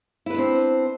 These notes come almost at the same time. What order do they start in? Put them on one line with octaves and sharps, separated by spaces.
E4 B4 D4 C4